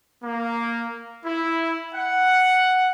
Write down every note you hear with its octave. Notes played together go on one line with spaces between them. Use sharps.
A#3
E4
F#5